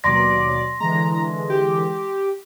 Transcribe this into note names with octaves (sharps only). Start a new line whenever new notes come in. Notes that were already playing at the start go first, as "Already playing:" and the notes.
D#2 B2 F#3 D5 C6 A#6
D3 E3 G#3 A#5
G4